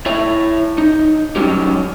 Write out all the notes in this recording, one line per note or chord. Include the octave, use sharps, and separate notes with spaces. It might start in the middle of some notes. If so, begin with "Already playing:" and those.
E4 C#5 E5
D#4
F#3 G3 C#4 D#4 G4